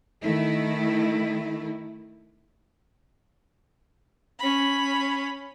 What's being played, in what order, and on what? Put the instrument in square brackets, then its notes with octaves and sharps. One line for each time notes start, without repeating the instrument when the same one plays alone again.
[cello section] D#3 A3 E4
[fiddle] C#4 B5